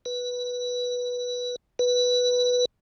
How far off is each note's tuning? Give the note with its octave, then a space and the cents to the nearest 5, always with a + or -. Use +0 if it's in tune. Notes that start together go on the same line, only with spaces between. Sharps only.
B4 -10
B4 -5